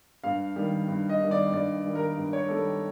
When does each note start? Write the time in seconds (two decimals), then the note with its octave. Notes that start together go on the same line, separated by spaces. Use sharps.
0.24 G2 F5
0.56 D#3 G3
0.88 G2
1.09 D#5
1.20 D#3 G3
1.31 D5
1.52 G2 D5
1.84 D#3 G3
1.95 A#4
2.17 G2
2.33 C#5
2.48 D#3 G3 A4